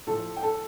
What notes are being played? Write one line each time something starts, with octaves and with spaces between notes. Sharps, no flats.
A2 F3 A4 A5
G5
A4 A5